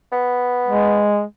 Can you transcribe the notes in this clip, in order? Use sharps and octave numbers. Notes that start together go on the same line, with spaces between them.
B3
G#3